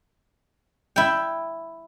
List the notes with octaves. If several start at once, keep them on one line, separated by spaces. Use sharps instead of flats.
E4 G5